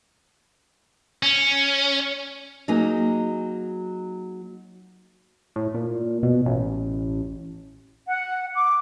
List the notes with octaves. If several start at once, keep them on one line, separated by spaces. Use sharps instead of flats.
C#4
F#3 A#3 D#4 G#4
A2
A#2
B2
A1
F#5
D6